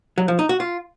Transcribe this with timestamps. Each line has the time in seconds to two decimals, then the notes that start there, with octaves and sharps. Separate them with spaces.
0.18 F#3
0.28 F3
0.39 D#4
0.49 F#4
0.60 F4